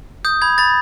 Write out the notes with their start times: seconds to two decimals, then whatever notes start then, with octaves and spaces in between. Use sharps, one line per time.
0.25 D#6 G6
0.42 B5 G#6
0.58 B5 A6